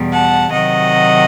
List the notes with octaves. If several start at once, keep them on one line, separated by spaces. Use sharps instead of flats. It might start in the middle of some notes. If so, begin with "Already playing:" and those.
Already playing: E2 B2 G3
F#5 A5
C3 D#3 F#3 D#5 F#5